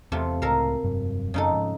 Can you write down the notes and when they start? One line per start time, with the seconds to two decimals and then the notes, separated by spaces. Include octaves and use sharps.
0.12 E2 C3 A3 F4
0.42 C#2 A2 A4 A#4 F5
0.83 F1 G2 F#3
1.34 F#2 C#3 D#4 A4
1.51 G#2 F3